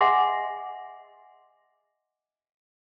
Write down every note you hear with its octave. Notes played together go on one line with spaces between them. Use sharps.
D#5 E5 F#5 G#5 C6 D6